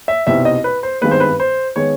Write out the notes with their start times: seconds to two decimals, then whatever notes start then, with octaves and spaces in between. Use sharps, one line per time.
0.08 E5
0.27 C2 B2 G3 C4 D#4 E5
0.45 D#5
0.64 B4
0.83 C5
1.01 G#1 G2 D#3 G#3 B3 B4
1.11 C5
1.20 B4
1.40 C5
1.76 D#3 G#3 B3 C#5